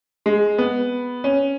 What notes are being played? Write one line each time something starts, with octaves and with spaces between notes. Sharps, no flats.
G#3
B3
C#4